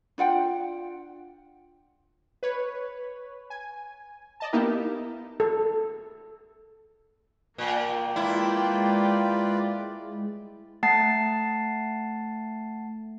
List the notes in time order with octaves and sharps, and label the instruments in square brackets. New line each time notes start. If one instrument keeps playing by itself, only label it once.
[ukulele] D4 F4 F#5 G5
[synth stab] B4 C#5
G#5
D5 D#5 A5
A#3 B3 D#4 E4 G4 A#4
[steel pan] A4
[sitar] A#2 [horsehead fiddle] A#3 G5
[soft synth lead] G#3 [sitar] E4 [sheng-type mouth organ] F4 B4 D5
[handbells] A3 F#5 A5 A6 C7